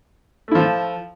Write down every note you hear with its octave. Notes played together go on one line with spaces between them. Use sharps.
F3 A3 E4